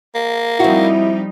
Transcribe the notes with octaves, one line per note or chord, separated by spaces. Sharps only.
A#3
F3 G3 C4 D#4 E4 F#4